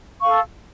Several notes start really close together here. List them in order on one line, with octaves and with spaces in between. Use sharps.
C#6 F5 A4